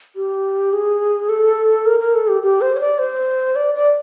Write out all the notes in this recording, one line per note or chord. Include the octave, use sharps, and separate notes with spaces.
G4
G#4
A4
A#4
A#4
A4
G4
G4
C5
C#5
D5
C5
D5
D5